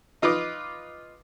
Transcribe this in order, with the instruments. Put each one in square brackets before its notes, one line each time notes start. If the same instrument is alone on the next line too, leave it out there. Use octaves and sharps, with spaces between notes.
[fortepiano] D#4 F4 B4 D#5 D6